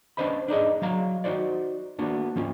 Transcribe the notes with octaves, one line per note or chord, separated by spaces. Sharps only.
C#4 D4 B4 C5 D#5 B5
D4 D#4 G#4 D#5
F#3 F5 A#5
D#4 F#4 C5 D5
A#3 B3 D4 F#4
F3 C#4 F4